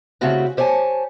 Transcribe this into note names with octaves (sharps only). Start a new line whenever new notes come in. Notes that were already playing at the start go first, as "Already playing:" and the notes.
C#3 A3 C4 E4 F#4 G4
G4 C5 C#5 F5 G#5 A5